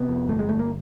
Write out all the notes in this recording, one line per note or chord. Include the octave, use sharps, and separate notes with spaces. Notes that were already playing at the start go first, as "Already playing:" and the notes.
Already playing: C3 B3
F2
G1 A3
G#3
G1 A3
A#3